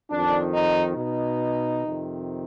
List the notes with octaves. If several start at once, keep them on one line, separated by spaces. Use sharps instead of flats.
F2 D#3 D4
D#4
B2 D#4
F2 C3 D#3